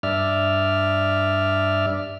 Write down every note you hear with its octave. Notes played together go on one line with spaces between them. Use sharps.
G2 D5 E5 F6